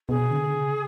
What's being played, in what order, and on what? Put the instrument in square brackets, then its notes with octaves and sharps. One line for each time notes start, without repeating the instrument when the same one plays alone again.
[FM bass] B2 [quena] G#4
[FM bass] D3
C#3